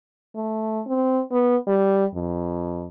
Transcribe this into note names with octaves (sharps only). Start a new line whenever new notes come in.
A3
C4
B3
G3
F2